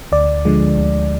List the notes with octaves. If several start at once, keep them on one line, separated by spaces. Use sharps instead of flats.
D2 D5
D3 F3 G#3
D2